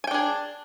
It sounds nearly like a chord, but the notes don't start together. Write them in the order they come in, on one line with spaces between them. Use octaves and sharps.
G#5 G5 D4 G#4